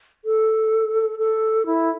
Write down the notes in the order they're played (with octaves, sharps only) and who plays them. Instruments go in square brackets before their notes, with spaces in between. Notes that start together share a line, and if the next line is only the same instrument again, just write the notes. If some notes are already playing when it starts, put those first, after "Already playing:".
[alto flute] A4
A4
E4